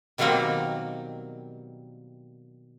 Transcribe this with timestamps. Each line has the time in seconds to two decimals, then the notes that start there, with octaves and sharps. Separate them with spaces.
0.18 B2 D#3 F#3 G3 A#3 C4